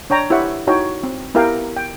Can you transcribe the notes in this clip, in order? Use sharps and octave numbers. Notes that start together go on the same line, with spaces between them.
D4 C#5 G5 A#5
E4 G4 C5 C#5 E5 F#5
D#4 E4 F#4 C#5 G5
C4
B3 E4 G4 A#4 F5 G5
G5